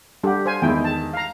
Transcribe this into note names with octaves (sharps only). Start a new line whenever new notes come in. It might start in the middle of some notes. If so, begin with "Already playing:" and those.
G3 D4 G4 A4 F#5
C5 F5 G#5
E2 D#3 G#3 E4 G5
A5
F5 A#5